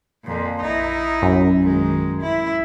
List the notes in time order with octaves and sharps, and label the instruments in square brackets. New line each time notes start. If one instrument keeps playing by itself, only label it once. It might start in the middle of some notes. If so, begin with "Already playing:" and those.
[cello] F2 A#2
[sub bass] A#1 [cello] D#4 E4
[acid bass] F#2
[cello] D#3 G#3
[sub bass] A1 [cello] E4